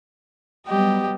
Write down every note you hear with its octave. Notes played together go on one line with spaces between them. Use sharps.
F#3 G3 B3 G4 D#5